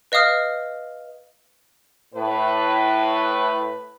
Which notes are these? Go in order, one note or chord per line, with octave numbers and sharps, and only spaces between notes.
B4 D#5 F5 D#6 F6
A2 B4